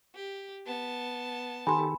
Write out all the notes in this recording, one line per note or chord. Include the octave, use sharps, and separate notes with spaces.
G4
B3 A5
D#3 G4 A4 G#5 B5 C6